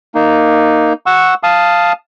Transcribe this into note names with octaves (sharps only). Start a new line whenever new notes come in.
A#3 D#4
F#5 C#6 E6
F5 A5 D#6